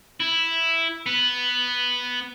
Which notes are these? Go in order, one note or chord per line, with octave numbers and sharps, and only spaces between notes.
E4
B3